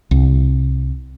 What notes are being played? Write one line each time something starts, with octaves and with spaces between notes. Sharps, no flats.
C2